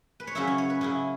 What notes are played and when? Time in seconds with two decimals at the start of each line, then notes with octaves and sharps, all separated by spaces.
0.20 B4
0.27 C#5
0.35 C#3 F#3 C#4 E4 E5
0.47 C#5
0.58 C#5
0.70 B4
0.81 C#3 F#3 C#4 E4